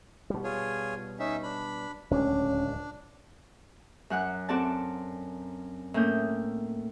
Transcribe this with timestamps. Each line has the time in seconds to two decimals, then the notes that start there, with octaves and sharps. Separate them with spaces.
0.30 B2 G3
0.44 F4 G#4 C#5
1.20 C#4 D#4 E5
1.43 D4 B5
2.11 D1 C#2 C#4 D4
4.10 F#2 F#5 F#6
4.49 C4 F#4 A4 D5 A5
5.94 A2 A#3 C#4 D#6 G6